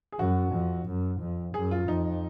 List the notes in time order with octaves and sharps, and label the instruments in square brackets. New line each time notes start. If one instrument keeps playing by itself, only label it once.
[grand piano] G#4
[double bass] F#2 [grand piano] F#4
[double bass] F2
F#2
F2
[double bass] F#2 [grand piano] G#4
[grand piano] F4
[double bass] F2 [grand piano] D#4